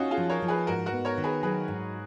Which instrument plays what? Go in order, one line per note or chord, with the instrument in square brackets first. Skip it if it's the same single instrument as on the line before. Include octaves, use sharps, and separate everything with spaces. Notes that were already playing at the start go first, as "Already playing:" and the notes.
Already playing: [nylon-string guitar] C#4 [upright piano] D#4 F4 F#4
[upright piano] F4 G#4
[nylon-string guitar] F3
[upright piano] A#4 C#5
[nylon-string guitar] F3
[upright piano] G#4 B4
[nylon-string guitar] G#2 [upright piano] F#4 A#4
[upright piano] F#4 A#4
[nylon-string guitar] B3
[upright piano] A#4 C#5
[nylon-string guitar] D#3
[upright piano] G#4 B4
[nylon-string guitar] F#3 [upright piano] G#4 B4
[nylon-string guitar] G#2